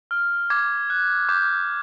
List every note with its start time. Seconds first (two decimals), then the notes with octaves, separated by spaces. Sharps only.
0.11 F6
0.50 D6 G#6
0.90 F#6
1.29 D6 G6